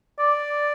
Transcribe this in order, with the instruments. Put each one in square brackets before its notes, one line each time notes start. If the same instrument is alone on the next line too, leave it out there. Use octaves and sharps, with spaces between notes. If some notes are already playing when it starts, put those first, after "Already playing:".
[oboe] D5